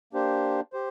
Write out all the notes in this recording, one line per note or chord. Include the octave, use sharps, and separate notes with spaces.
A#3 D4 G4 C5
G4 C5